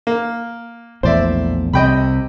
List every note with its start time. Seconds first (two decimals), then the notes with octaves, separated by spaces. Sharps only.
0.07 A#3
1.03 A#1 E2 A2 C5 D5 E5
1.73 C2 C3 D#5 G5 B5